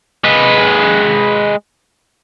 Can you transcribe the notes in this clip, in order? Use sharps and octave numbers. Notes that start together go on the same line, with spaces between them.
G#3 B4